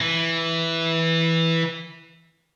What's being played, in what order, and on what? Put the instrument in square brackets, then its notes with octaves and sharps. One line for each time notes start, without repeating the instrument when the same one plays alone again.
[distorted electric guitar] E3